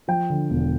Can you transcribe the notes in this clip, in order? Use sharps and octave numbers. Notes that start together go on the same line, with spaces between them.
F3 G5
D3
E1